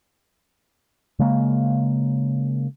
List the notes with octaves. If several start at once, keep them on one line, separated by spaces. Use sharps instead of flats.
C#3 G#3 A#3